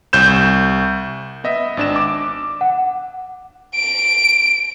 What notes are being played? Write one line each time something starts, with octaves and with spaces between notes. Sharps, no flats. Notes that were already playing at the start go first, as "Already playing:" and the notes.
C2 G6 E7
B3 D#5 E5
G#1 D4 E7
D6
F#5
D7